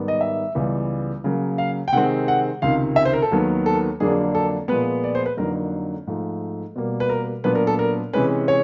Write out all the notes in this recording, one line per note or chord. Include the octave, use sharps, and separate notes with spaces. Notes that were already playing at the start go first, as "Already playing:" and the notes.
Already playing: G#2 D#3 G3 B3
D#5
E5
C#2 C#3 E3 G3 B3
C#3 F#3 A#3
F5
G5
C3 D#3 G#3 C4 F#5
F#5
C#2 C3 D#3 F5
E5
C5
A#4
A4
D#2 D#3 F#3 B3
A4
F2 D3 F#3 A#3 D4 G#4
A4
A#2 F3 G#3 B3 B4
D5
C5
B4
F2 D3 F#3 A#3 D#4 A#4
G#2 F3 A3
B2 G3 A#3
B4
A#4
A#2 F#3 B3 D4 B4
A#4
A4
A#4
C3 E3 G#3 C#4 B4
C#5